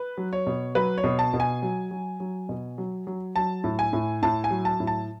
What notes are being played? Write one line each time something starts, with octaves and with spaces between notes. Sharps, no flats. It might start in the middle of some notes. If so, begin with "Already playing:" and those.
Already playing: B4
F#3
C#5
B2
F#3 B4
C#5
B2
A5
B2
G#5
F#3
F#3
F#3
B2
F#3
F#3
F#3 A5
A2
G#5
A2
A2 A5
G#5
F#3
A5
A2
A5